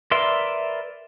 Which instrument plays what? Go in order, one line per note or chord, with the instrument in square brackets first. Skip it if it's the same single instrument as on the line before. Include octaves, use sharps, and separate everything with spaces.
[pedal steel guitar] A#4 B4 D5 E5 C6